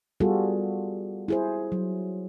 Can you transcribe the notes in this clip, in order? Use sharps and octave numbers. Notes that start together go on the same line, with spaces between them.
G3 B3 F4 F#4 G#4 A4
E4 G#4 C5
F#3